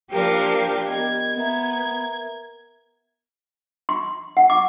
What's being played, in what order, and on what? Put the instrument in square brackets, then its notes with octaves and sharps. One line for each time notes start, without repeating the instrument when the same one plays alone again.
[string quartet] F3 A#3 D4 [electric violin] G4 A#4 [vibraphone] G5
[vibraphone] B3 D#5 [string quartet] G#6
[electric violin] B3 [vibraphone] A#4 E5 A#5
[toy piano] C6
F#5
D6